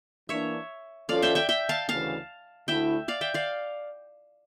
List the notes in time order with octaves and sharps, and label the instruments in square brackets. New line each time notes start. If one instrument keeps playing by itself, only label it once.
[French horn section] E3 A#3 D4 [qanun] C#5 E5
[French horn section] F3 C#4 F4 A4 [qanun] D5 F5
[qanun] E5 G5
E5 G5
E5 G5
F5 A5
[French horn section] D2 C#3 E3 [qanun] F5 A5
[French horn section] D2 D3 A3 E4 [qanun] E5 G5
[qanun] D5 F5
E5 G5
D5 F5